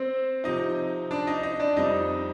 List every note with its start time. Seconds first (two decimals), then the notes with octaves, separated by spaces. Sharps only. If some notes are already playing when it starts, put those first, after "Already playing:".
Already playing: C4 C5
0.44 C3 F3 C4 D#4 D#5
1.11 D4 D5
1.27 D#4 D#5
1.43 D#4 D#5
1.60 D4 D5
1.77 F2 C3 G3 C4 D#4 D#5